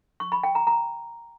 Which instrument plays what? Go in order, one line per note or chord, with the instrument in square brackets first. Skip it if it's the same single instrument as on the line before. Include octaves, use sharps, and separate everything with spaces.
[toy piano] C#6
B5
G5
A#5
A#5